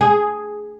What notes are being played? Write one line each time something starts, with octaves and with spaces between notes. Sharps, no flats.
G#4